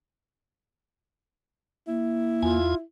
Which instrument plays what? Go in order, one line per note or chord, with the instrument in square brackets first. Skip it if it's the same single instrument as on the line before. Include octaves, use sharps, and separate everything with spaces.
[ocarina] A#3 [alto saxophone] E4
[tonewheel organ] E2 G#5 [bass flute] F4